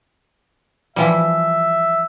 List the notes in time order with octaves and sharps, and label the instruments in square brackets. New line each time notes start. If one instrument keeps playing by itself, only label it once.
[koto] E3 F3 G3 [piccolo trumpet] E5